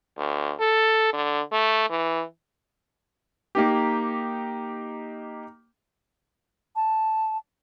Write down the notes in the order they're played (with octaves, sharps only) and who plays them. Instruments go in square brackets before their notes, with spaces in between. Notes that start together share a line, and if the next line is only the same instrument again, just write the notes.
[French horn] D2
A4
D3
A3
E3
[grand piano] A#3 D#4 G4
[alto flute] A5